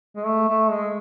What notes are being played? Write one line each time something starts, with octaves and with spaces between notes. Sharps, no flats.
G#3
A3
A3
G#3